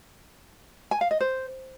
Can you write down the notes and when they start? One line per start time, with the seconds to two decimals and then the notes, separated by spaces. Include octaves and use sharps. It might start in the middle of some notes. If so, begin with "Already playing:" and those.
0.91 G#5
1.01 F5
1.11 D#5
1.20 C5